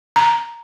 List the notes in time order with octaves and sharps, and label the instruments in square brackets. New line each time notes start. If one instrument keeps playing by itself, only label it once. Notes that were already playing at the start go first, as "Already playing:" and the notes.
[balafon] A#5